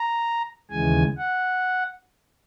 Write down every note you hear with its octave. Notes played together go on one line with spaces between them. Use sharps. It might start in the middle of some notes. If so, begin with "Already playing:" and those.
Already playing: A#5
D#2 C#3 E3 G#3 G#5
F#5